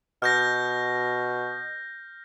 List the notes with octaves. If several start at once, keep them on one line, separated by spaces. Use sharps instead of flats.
B2 F6 G6 A#6